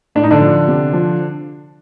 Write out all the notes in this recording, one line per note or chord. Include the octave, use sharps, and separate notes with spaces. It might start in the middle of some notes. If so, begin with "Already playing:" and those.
A2 D4
D#4
D3 D4
F3
C3
F3